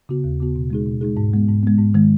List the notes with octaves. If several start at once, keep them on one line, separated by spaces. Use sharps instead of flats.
C#3 B3 F#4
D#2
C#3 B3 F#4
B2
G#3 D#4 G#4
B2
G#3 D#4 G#4
G#2
G#3 B3
G#2
G#3 B3
G#2
D#3 G#3